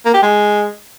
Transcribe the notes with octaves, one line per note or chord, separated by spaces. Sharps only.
A#3
G4
G#3